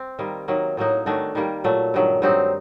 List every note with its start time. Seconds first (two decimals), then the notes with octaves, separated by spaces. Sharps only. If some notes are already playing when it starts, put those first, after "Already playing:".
Already playing: C4
0.19 D#3 G3 A#3
0.48 D#3 F#3 A#3
0.77 A2 F#3 A#3 D#4
1.06 D#3 A3 D4 F#4
1.35 D#3 G3 A#3
1.64 A#2 F#3 A3
1.94 G2 D#3 F#3
2.22 G2 F#3 C4 D#4